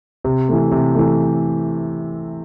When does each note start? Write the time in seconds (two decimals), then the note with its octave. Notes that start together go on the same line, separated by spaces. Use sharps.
0.24 C3
0.49 E3 A3
0.72 C3
0.95 E3 A3